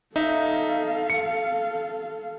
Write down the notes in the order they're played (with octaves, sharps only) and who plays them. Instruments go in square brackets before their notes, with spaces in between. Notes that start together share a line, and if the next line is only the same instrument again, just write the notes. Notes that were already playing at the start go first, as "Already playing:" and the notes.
[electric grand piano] D#4 E5 [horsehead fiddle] A4 F5
[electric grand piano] C#7